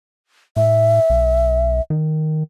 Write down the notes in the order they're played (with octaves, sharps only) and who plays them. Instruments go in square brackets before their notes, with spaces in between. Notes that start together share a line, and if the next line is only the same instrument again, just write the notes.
[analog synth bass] A2 [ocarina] E5
[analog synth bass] B1
D#3